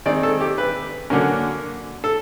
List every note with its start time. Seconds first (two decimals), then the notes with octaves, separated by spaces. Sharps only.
0.06 D#3 G#3 C4 D5
0.23 A4
0.40 G4
0.58 B4
1.10 D3 F#3 A#3 C#4 A#4
2.04 A4